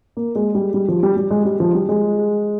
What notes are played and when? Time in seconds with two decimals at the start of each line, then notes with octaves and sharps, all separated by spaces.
0.17 A#3
0.35 G#3
0.55 G3
0.74 G3
0.88 F3
1.03 G3
1.17 G3
1.31 G#3
1.45 G3
1.60 F3
1.75 G3
1.89 G#3